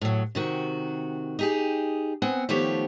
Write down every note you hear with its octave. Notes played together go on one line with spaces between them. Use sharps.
A2 F#3
C3 D#3 F#4
D#4 G4 G#4
B3 C4 F#5 G#5
D#3 F3 A3 B3 G4 C#5